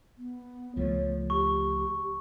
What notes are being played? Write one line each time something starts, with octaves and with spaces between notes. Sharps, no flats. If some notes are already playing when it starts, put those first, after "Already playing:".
B3
C#2 F3 A3 C#5
G4 C#6